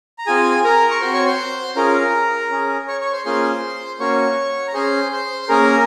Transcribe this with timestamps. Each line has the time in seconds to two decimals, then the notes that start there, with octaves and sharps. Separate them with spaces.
0.18 A#5
0.27 C4 F4 G#4 G#5
0.64 A#4 A#5
0.91 C#6
1.01 C4 F#4 C5 C6
1.13 C#5 C#6
1.26 C5 C6
1.76 C#4 F4 G#4 A#4 A#5
2.51 C#4 G#4
2.88 C#5 C#6
3.00 C#5 C#6
3.12 C5 C6
3.25 A#3 C#4 F4 G#4 C5 C6
3.99 A#3 C#4 F#4 C#5 C#6
4.68 A#5
4.74 C#4 G#4 C5 C6
5.12 C5 C6
5.42 C6
5.49 A#3 C#4 G#4 A#4 A#5